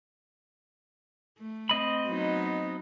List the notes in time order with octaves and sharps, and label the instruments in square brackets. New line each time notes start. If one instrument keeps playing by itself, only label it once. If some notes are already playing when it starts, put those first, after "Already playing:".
[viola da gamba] A3
[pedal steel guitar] C4 D#5 B5
[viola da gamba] F#3 B3 D#4